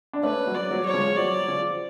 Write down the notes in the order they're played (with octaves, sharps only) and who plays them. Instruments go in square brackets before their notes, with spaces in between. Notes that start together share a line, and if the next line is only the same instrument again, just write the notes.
[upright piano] D4
[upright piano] A3 C#4 [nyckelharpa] B4
[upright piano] F#3
[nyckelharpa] D5
[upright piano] F#3
[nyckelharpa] C#5
[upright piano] F3 G#3
[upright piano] F#3 [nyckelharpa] D5
[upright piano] F3